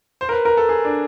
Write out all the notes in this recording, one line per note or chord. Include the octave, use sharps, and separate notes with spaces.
C5
A#4
B4
A#4
A4
G#4
D4